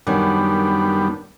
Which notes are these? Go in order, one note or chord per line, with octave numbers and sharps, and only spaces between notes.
F#2 D#3 G3 B3 D4